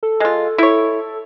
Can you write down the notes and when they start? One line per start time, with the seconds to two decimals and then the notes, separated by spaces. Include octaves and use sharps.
0.03 A4
0.20 G#3 F4
0.58 E4 C#5